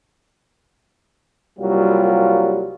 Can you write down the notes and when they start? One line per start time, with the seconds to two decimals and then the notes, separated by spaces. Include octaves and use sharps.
1.59 C2 F#3 G3 A#3 F4